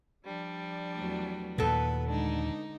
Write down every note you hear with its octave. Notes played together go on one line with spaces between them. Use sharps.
F3 G3 D4
E2 F#3 A3
D#2 A#2 B3 A4 B4
D3 G#3 D4 D#4